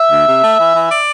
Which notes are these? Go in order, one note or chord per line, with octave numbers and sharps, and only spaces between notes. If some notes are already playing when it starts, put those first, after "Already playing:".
Already playing: E5
D2
C3
A3
E3
E3
D5